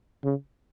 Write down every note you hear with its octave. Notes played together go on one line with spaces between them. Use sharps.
C#3